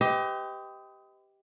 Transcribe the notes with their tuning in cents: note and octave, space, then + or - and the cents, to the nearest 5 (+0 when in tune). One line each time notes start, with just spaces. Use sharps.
G4 +0 B4 +45 D#5 +25